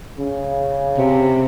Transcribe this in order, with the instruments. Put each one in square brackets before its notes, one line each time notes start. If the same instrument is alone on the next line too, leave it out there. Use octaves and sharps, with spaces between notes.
[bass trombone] C#3
[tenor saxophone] C3